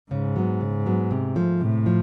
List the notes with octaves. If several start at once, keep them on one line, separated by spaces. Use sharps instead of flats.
G#2 C#3
F#3 B3
C#3
F#3 B3
C3
F3 A3
A2 C3
F3